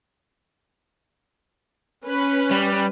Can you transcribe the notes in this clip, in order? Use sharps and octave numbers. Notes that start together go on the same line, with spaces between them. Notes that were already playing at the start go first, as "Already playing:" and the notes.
C#4 B4
G3